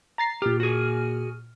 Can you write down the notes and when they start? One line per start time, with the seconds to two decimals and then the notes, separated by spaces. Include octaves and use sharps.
0.18 A#5 A6 C7
0.42 A#2 G4 F6
0.60 F#4 G#4